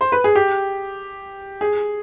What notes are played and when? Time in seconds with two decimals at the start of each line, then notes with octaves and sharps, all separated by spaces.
0.01 C5
0.12 B4
0.24 G#4
0.35 G4
1.61 G#4